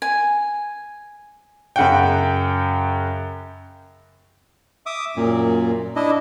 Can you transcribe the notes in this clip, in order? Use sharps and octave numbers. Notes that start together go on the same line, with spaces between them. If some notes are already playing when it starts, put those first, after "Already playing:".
G#5
F#2 C#3 F#5 G5
E5 D6 D#6
F#2 A#2
D4 E4 D#5